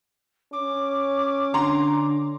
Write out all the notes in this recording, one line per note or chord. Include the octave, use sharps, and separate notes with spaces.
C#4 D6
D3 A#5 C6